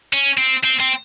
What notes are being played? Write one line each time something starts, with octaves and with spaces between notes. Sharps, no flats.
C#4
C4
C4
C4